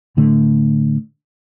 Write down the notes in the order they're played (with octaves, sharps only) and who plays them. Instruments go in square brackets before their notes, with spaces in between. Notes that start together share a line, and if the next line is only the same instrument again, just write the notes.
[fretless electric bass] A2 D3 A3